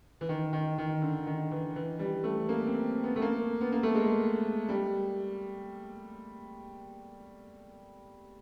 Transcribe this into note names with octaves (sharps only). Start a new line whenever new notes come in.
E3
D#3
D#3
D#3
D3
D#3
E3
E3
G3
A3
A#3
C4
B3
A3
A#3
B3
A#3
A3
G#3
G3